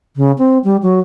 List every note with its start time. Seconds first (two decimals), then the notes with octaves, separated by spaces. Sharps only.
0.16 C#3
0.38 C4
0.64 G3
0.82 F#3